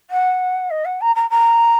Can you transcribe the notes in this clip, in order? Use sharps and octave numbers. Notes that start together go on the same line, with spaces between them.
F#5
D#5
F#5
A#5
A#5
A#5